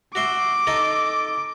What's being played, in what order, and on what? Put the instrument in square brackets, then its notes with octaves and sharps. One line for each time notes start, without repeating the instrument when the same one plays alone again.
[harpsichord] F#4 E5 C6 [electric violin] D6
[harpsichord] D#4 A4 D#5